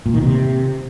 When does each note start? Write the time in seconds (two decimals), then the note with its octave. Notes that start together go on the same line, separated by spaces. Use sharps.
0.06 A#2
0.14 D#3
0.22 C3